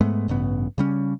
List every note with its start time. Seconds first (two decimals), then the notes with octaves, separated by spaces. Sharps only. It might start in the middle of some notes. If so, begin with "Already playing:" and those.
0.01 G#2 G#3 A3 B3
0.28 A1 G2 C#3 B3
0.78 C#3 G3 C#4